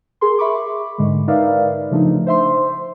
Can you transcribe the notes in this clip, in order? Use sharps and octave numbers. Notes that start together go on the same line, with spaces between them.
G#4 A#4 C6
E5 B5 C#6 D6
G#2 D3 G#3
D#4 A#4 B4 D5 E5 F5
C#3 F3 A3 D4 D#4
C5 E5 C6